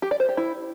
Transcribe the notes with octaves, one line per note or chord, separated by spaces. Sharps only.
G4
D5
C5
G4
E4